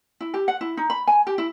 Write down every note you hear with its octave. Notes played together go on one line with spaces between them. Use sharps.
E4
G4
F#5
E4
D#4
B5
G#5
G4
E4